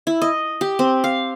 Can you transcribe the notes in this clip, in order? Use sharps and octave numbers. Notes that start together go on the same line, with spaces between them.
E4
D#5
G4
C4
F5